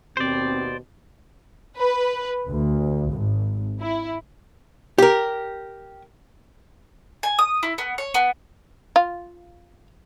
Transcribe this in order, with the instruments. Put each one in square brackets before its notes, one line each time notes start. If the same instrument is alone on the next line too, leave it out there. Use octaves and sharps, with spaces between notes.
[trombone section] D#2 B2 [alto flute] C4 [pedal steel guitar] C5 D5
[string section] B4
D2
G#1
E4
[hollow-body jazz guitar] G4 A#4
[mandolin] G#5
D#6
E4
B3
C#5
B3
[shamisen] F4